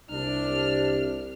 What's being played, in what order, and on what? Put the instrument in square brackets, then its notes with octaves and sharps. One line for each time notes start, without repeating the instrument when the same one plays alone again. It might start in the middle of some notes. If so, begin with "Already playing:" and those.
[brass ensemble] C2 C3 [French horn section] D4 [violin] F6